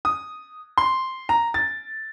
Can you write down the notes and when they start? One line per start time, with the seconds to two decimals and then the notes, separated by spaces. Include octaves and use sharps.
0.05 D#6
0.78 C6
1.29 A#5
1.54 A6